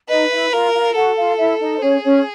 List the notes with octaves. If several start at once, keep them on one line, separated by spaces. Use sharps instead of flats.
D#4 B4 D#5
E4 E5
F4 A#4 F5
F4 F5
F#4 A4 F#5
F4 F5
E4 E5
D#4 D#5
C5
C#4 G#4 C#5
C#4 C#5